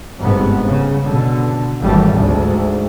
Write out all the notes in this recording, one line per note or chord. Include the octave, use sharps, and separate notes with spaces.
G1 G#2 C3 B3
C#3
B2 D3
G#1 E2 G3 A3
D2 G#2